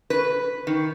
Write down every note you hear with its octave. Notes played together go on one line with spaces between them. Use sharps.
B4
D#3